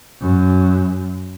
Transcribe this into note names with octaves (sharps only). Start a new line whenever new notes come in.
F#2